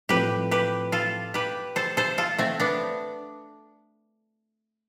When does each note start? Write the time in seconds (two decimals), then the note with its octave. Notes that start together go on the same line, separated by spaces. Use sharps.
0.09 A2 F3 C4 G4 B4
0.51 G4 B4
0.92 F4 A4
1.34 G4 B4
1.76 A4 C5
1.97 A4 C5
2.18 F4 A4
2.38 A3 C4
2.60 B3 D4